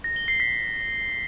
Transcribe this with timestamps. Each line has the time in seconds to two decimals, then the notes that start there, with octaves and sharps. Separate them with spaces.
0.04 A#6
0.16 G7
0.28 C7
0.40 B6